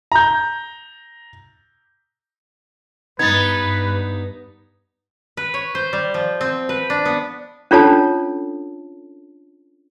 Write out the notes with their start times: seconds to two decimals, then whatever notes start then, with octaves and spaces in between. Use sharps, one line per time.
0.12 A#5 G6
3.19 G2 B3 D#4 B4 G#6 A6
3.58 G2
5.37 B4
5.54 C#5
5.75 C5
5.93 G3
6.14 F3
6.41 C4
6.69 B4
6.90 D4
7.05 B3
7.71 C#4 D4 F4 A4 C#5 A5